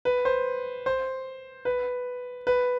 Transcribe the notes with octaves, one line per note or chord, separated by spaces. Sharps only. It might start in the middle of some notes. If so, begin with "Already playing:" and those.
B4
C5
C5
B4
B4